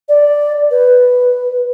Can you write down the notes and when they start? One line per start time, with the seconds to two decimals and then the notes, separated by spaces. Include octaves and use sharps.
0.09 D5
0.71 B4